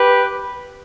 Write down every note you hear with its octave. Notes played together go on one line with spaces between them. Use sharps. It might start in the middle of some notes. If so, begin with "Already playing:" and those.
Already playing: G4 B4